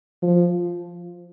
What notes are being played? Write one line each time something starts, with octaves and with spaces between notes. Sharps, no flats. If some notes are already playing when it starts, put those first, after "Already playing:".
F3